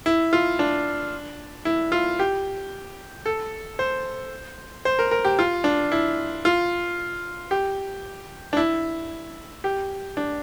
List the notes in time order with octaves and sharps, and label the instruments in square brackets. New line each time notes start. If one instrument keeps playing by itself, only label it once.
[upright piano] E4
F4
D4
E4
F4
G4
A4
C5
C5
A#4
A#4
G4
F4
D4
E4
F4
G4
D4
E4
G4
D4